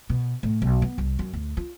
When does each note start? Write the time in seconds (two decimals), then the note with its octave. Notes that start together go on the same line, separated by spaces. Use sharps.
0.09 B2
0.43 A2
0.62 B1
0.82 B3
0.98 C2
1.19 F#2
1.33 D2
1.57 F4